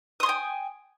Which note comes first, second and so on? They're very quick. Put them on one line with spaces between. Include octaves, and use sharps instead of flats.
D#6 C6 G#5 G5